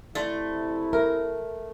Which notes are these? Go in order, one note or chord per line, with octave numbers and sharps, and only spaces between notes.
C3 A3 E4 D5 C6
A#4 E5